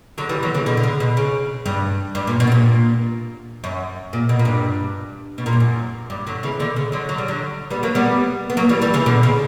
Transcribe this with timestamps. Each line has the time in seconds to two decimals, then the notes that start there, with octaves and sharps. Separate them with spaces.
0.18 D3 F#3
0.29 E3 G3
0.43 D3 F#3
0.54 C#3 E3
0.66 B2 D3
0.77 D3
0.83 C#3
1.00 B2
1.17 C#3
1.66 G2
2.15 G2
2.27 A#2
2.40 B2
2.47 G2
2.52 A#2
3.64 F#2
4.13 A#2
4.29 B2
4.39 A#2
4.45 G2
5.38 B2
5.46 A#2
5.53 G2
5.60 F#2
6.10 G2
6.27 D3 F#3
6.43 C#3 E3
6.60 B2 D3
6.76 C#3
6.92 D3 F#3
7.09 F#3
7.18 G3
7.28 D3 F#3
7.70 G3 B3
7.83 F#3 A#3
7.95 G3 B3
8.50 B3
8.57 F#3 A#3
8.69 E3 G3
8.82 E3 G3
8.94 C#3 E3
9.06 B2 D3
9.23 C#3